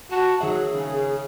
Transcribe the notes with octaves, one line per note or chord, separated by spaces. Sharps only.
F#4 A5
D#3 F#3 G#4 E5
C#3